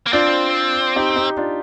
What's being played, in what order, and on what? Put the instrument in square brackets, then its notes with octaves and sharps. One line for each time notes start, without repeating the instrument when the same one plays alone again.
[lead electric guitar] A#3
[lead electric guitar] C4 [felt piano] D4 F4
[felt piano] D#4 G4
D#4 G4
D4 F4